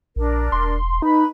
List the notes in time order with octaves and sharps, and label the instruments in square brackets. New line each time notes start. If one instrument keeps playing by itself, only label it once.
[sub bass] A#1 [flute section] D4 A#4
[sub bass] E1 [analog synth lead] C6
[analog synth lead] D#4 [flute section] B4 B5